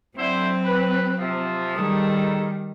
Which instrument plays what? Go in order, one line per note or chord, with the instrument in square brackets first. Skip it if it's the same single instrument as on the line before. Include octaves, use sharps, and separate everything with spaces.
[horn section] D3 E4 C5 [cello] F#3 C4
[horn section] B4
C3 F3
[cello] D#3 G3 [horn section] D#4 G#4 A4